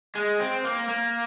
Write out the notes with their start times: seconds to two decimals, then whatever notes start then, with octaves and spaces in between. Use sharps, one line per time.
0.15 G#3
0.39 C4
0.64 A#3
0.88 A#3